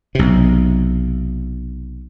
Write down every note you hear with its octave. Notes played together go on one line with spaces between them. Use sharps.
B1 C3